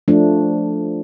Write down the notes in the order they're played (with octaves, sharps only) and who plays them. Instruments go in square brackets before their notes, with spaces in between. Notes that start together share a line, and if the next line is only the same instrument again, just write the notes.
[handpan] F3 A3 D4